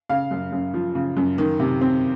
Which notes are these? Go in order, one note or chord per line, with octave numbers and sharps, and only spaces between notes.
C#3 F5
F#2
F#2
F3
C#3
F#2
D#3
C3
C4